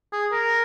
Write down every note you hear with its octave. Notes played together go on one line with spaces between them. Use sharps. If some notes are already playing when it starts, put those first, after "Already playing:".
G#4
A#4